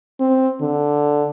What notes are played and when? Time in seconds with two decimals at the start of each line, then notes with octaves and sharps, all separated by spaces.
0.20 C4
0.61 D3